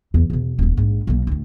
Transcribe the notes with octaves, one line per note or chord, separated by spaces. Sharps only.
E2
E2 B2
D#1 A#3
A#1 G#2
B1 A#3
D2 A2